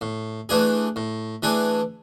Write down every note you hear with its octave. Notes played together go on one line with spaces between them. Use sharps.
A2
E3 A3 D4 G#4
A2
E3 A3 D4 G#4